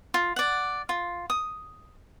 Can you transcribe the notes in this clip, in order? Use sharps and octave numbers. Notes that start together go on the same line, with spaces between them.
F4
D5 F#5
F4
D#6